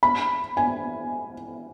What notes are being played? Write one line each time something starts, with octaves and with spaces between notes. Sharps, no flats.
B5
G#5